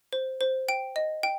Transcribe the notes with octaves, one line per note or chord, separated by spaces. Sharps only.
C5
C5
G5 D7
D#5
G5